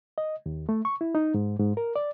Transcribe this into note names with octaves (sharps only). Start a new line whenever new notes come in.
D#5
D#2
A3
C#6
E4
D#4
G#2
G#2
A#4
D5